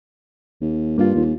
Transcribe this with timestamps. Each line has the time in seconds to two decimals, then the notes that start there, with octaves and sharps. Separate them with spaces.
0.61 D#2
0.98 G2 A#3 F4
1.15 D#2